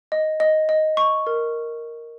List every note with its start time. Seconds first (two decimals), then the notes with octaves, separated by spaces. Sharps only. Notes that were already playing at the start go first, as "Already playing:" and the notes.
0.12 D#5
0.40 D#5
0.69 D#5
0.97 C#6
1.27 A#4